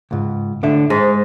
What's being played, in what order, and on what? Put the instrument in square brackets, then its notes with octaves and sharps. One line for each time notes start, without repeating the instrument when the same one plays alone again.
[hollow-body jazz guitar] C#2 G#2
A2 D3 E5
[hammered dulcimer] G#2 [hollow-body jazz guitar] G#4